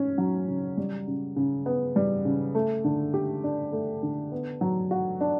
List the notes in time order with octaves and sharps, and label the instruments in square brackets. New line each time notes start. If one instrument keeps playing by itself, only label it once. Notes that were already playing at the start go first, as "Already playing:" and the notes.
Already playing: [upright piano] C#4
F#3
C#3
G3
C#3
C#3
B3
G3
C#3
A3
D3
G4
D4
A3
D3
B3
F#3
F#4
D4